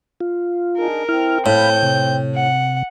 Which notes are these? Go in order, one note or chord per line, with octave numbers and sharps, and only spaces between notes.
F4
D4 D#4 G#4 A#4
C4 E4 F6
A2 F5 B5 G6
C3
F#5